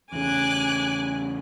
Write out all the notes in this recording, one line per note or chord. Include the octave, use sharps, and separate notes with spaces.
E2 C#3 G#5 D6 F#6